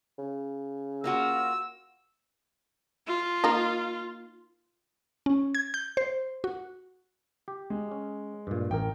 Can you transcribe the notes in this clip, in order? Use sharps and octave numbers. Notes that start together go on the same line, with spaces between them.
C#3
A#3 F4 F#4 E6
F4
A#3 D#4
C#4
G#6
G6
C5
F#4
G4
G#3
C#4
G2 A#2
A1 A#4 G5